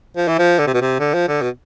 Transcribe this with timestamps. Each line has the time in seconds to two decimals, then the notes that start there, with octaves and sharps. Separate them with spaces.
0.17 F3
0.28 E3
0.39 F3
0.59 D3
0.67 C3
0.74 B2
0.82 C3
1.00 D3
1.14 F3
1.28 D3
1.42 B2